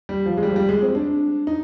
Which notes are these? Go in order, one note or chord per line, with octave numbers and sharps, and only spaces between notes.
G3
F3
G#3
G3
F3
G3
G#3
C4
D4
D#4